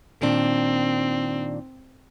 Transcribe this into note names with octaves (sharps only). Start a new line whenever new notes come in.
A#2 D#3 C4 D4